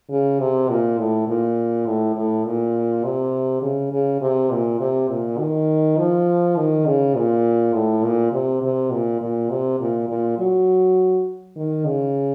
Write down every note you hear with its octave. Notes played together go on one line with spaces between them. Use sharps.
C#3
C3
A#2
A2
A#2
A2
A2
A#2
C3
C#3
C#3
C3
A#2
C3
A#2
D#3
F3
D#3
C#3
A#2
A2
A#2
C3
C3
A#2
A#2
C3
A#2
A#2
F#3
D#3
C#3